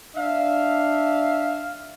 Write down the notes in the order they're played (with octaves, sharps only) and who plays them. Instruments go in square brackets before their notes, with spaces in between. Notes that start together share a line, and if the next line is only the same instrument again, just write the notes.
[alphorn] D4 [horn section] E5 F5